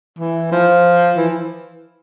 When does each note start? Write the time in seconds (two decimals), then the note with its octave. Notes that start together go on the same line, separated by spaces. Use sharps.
0.19 E3
0.52 F3
1.17 E3